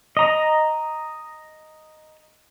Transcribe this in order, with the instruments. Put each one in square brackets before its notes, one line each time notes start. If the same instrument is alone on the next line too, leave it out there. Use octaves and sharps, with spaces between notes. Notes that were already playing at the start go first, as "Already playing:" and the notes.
[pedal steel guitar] D#5 A#5